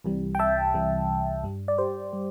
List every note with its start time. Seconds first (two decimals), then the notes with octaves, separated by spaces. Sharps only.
0.04 C2 C3 E3 G3
0.35 G5
0.39 E5 A5
0.74 C2 C3 E3 G3
1.44 G2 G3
1.68 D5
1.78 G4 C5
2.13 G3